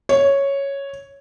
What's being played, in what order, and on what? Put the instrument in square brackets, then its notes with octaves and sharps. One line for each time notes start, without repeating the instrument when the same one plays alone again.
[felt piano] C#5